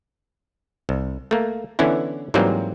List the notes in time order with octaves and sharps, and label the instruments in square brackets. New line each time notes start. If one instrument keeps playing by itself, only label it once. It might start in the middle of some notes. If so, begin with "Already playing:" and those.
[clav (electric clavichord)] C2
A3 A#3
D3 E3 B3 C#4 E4
G#2 E3 F#3 G3 A#3 C4